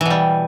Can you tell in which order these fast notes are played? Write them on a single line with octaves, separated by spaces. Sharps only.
E3 B2 G3